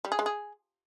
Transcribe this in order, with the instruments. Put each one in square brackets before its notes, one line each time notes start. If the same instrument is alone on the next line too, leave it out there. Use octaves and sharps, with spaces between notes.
[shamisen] G3
G#4
G#3
G#4